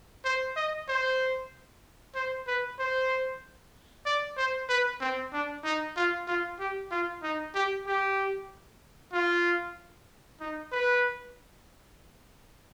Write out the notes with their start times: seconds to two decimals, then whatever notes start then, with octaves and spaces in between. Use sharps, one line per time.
0.25 C5
0.56 D#5
0.88 C5
2.15 C5
2.47 B4
2.79 C5
4.06 D5
4.37 C5
4.69 B4
5.00 C4
5.33 D4
5.64 D#4
5.96 F4
6.27 F4
6.59 G4
6.91 F4
7.23 D#4
7.54 G4
7.87 G4
9.13 F4
10.40 D#4
10.72 B4